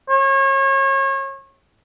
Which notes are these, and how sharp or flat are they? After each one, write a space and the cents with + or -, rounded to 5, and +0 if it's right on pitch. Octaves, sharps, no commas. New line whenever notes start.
C#5 -35